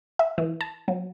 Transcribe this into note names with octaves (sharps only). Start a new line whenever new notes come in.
E5
E3
A5
F#3